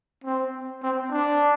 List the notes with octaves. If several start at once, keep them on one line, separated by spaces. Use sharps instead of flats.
C4
C4
D4